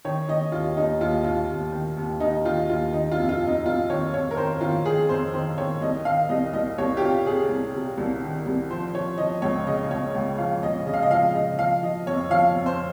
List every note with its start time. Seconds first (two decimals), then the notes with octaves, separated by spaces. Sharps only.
0.05 D#3 C#5
0.29 D#3 D#5
0.52 D#2 F4
0.76 D#2 D#4
1.01 D#2 F4
1.24 D#2 F4
1.49 D#2
1.72 D#3
1.97 D#2
2.20 D#2 D#4
2.45 D#3 F4
2.69 D#2 F4
2.93 D#3 D#4
3.11 F4
3.17 F2
3.29 F4
3.41 F2
3.47 D#4
3.66 F2 F4
3.89 D#3 C#5
4.13 F2 C#5
4.31 A#4
4.37 D#3 C5
4.61 D#3 F4
4.85 D#3 G#4
5.09 F2 C5
5.34 D#3 C5
5.58 D#3 C#5
5.81 C2 D#5
6.05 D#3 F5
6.29 C2 D#5
6.53 C2 D#5
6.78 C2 C#5
6.97 G4
7.02 C3 F4
7.25 C3 G#4
7.49 C2
7.74 C3
7.98 C2
8.22 D#3
8.46 C2
8.70 F3 C5
8.94 F3 C#5
9.18 F3 D#5
9.42 C#2 C#5
9.66 C#3 D#5
9.90 C#2 C#5
10.15 C#2
10.38 F3 F5
10.63 C#2 D#5
10.86 C#3 D#5
10.94 F5
11.02 D#5
11.11 F3 F5
11.35 C#3 D#5
11.58 F3 F5
11.83 F3 D#5
12.07 F2 C#5
12.30 F3 F5
12.55 F2
12.66 C5